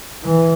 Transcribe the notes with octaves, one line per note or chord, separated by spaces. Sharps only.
E3